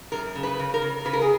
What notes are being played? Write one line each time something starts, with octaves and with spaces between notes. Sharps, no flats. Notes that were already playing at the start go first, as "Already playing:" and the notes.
F#2 A#4
C#3
B4
C#3
A#4
C#3
C#3 B4
A#4
G#4